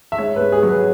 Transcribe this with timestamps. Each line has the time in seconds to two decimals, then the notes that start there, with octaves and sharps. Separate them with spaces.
0.12 E5
0.18 G#2 C#5
0.36 G#2 B4
0.52 G#4
0.63 F#3 C#5
0.69 B4